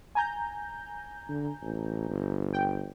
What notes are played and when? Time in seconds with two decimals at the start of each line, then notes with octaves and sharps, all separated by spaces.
0.15 G#5 A#5 G6
1.29 D3
1.62 A1
2.09 G1
2.53 G5